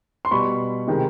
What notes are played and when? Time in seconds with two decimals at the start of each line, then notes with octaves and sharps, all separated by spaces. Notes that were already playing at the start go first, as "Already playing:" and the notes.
0.25 C6
0.31 B2 G3 B5 C#6
0.88 C3 D#3 G#3